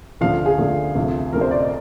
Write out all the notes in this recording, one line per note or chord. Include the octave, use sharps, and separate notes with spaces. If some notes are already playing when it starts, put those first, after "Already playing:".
D2 D3 F3 F5
G#4
D2 D3 F3
D2 C3 F3
D2 C3 F3 A#4
C5
D5
D#5